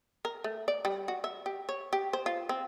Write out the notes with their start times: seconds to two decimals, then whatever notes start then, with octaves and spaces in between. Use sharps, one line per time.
0.25 A#4
0.44 A3
0.68 D5
0.85 G3
1.08 F#4
1.24 E5
1.46 G4
1.69 C#5
1.93 G4
2.13 C5
2.26 F4
2.49 C4